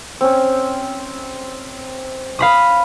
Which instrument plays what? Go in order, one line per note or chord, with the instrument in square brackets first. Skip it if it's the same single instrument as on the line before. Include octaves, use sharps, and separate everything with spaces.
[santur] C4 C#4
[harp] F5 B5 D#6